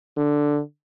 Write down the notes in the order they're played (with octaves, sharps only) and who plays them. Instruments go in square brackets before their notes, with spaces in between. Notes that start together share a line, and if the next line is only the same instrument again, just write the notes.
[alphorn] D3